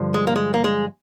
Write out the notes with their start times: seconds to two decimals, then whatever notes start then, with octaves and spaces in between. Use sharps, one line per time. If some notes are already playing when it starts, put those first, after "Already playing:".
Already playing: G2 D3 F3
0.14 G#3
0.27 A#3
0.36 G#3
0.54 A#3
0.64 G#3